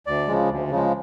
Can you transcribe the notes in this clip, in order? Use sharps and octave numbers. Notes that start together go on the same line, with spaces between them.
D2 D5
C#3 F3 G#3
D2
C#3 F3 G#3